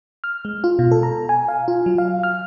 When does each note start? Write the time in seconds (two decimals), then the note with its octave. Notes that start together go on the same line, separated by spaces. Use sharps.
0.24 F6
0.45 G#3
0.64 F4
0.79 B2
0.92 A4
1.03 A#5
1.29 G#5
1.48 F5
1.68 F4
1.86 F#3
1.98 F5
2.23 F6